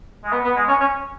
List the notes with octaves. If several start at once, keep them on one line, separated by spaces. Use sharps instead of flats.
G#3
B3
B3
G#3
C#4
C#4